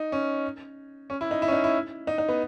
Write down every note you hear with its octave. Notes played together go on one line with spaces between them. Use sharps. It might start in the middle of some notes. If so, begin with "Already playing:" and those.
Already playing: D#4
C#4
C#4
E4
D#4
E4
C#4
D#4
E4
D#4
D#4
B3